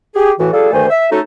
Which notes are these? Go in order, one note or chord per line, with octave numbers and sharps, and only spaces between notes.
G4 G#4
A2 E3 F#4
G3 F4 G#4 A4
D2 G2 D#3 A3 C5 G#5
E5
A3 C#4 D#4 F#4 A4